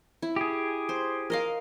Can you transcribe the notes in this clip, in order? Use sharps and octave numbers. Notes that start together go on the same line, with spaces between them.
E4
G4 G#4
C5
A#4 D#5 F5